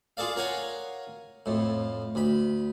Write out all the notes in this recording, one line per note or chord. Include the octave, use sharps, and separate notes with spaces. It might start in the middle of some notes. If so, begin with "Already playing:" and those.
F4 G#4 A4 D5 F5
A#4 C#5 F5 F#5 G#5 A#5
F2 A2
D2 B5